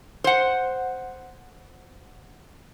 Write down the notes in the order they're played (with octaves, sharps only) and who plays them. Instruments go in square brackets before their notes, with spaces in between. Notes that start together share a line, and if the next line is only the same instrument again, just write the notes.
[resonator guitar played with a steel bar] C5 F#5